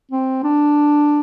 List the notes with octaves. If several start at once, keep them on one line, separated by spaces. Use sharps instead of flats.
C4
D4